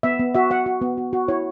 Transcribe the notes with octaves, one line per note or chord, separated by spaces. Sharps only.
B3 E5
B3
F#4 E5
F#4 F#5
F#4
B3
F#4
F#4
E4 C#5